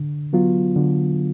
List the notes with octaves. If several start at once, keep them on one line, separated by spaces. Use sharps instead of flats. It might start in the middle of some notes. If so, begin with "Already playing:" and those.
Already playing: D3
F#3 B3 F4
D3